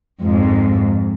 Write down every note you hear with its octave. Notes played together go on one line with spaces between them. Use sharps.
F2 G#2